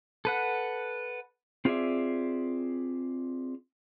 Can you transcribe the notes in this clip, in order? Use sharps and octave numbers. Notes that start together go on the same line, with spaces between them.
A4 B4 F#5
C4 F4 G#4 C#5 D5 E5